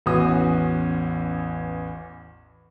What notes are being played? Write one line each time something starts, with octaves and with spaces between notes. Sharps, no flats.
A1 E2 C#4 F#4 D#6